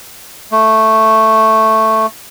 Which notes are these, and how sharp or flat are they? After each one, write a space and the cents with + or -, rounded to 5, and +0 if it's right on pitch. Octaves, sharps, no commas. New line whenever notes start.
A3 +5